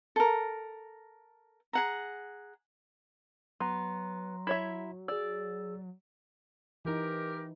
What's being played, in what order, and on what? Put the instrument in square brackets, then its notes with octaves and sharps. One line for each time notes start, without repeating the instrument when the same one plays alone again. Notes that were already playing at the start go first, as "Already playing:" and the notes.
[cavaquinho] A4 A#4
G#4 F#5 A#5
[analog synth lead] F#3 [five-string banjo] B3 [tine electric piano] A#5 C6
[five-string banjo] E4 C#5 E5
[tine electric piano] G#4 E6 [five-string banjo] D5
[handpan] E3 D#4 [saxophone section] G4 A#4